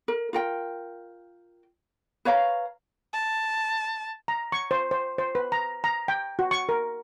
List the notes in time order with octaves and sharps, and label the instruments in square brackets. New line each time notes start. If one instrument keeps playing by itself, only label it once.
[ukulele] A#4
F4 A#4 G5
B4 C#5 F5 A#5
[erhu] A5
[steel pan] A#5
C#6
C5
C5
C5
B4
A#5
A#5
G5
F#4
C#6
A#4